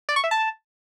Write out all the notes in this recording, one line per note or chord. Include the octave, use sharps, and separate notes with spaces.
D5
C#6
E5
A5